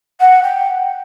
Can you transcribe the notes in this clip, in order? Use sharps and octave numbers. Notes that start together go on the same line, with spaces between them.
F#5
G5